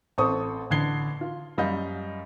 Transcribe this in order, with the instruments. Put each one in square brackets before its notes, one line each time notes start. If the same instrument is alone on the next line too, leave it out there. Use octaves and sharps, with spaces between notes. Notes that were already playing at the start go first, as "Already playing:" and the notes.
[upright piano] A1 C4 A4 C5 C#6 D#6
A1 D3 G#6 C7 G7
F4
F#2 G3 D#5 F5 G6